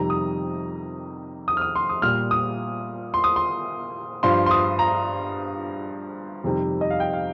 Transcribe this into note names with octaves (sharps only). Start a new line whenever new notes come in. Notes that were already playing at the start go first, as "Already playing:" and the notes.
Already playing: F2 C3 D#3 G3 A#5
D#6
D#6
F6
D#6
C6
D#6
A#2 G3 F6
D#6
C6
D#6
C6
G2 F3 C6
C6
D#6
A#5
F2 C3 D#3 G3
D#5
F5
G5
F5